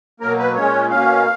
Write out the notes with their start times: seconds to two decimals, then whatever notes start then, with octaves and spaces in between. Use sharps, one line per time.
0.20 B2 F#3 A#3 A#4
0.38 B4
0.55 A#2 G#3 C#4 C#5
0.91 B2 A#3 C#4 F5